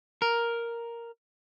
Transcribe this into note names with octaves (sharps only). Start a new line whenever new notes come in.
A#4